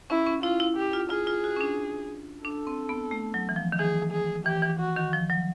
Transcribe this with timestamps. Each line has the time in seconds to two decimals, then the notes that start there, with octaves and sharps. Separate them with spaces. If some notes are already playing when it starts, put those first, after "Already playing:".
0.10 C#4 E4
0.26 C#4
0.43 E4 F4
0.60 E4
0.77 G4
0.93 F4
1.10 F4 G#4
1.27 F4
1.44 F#4
1.56 C#4
1.61 D4
2.45 D4 A4
2.67 C4
2.89 B3
3.11 A3
3.34 F#3
3.49 E3
3.56 F3
3.72 D#3
3.79 E3 G#4
4.12 G#4
4.46 E3 G4
4.62 E3
4.80 F#4
4.96 D#3
5.13 F3
5.30 F#3